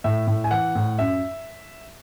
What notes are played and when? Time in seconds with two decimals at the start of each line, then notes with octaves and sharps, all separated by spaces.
0.04 A2 E5
0.27 A2
0.44 G#5
0.51 E3 F#5
0.75 A2
0.99 F#2 E5